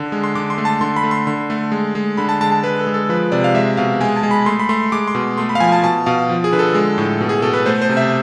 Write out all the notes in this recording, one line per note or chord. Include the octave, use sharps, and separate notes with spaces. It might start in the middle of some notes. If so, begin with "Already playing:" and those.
Already playing: D3
G#3
C6
D3 D6
C6
A3
A5
D3 C6
B5
A3
C6
D3 C6
A3
G#3
G#3
D3 B5
A5
G#3 A5
A5
G#3 B4
A4
G#3
A4
F3 B4
C3 D5
F5
G#3 E5
B2 F5
G#3 G#5
A5
G#3
B5
A3 C6
B5
A3 C6
G#3 D6
C6
B2
A3 C6
B5
F5
F3 G#5
A5
B2 A5
B2 F5
F3
G#4
D3 B4
A4
G#3
A2
B2
G#4
B2 A4
B4
A3 C5
C5
C3
E5